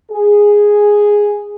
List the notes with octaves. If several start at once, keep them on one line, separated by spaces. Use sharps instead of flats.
G#4